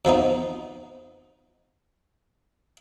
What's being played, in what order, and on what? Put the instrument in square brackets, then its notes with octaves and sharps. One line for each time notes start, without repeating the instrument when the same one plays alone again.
[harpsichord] F2 F3 B3 D#4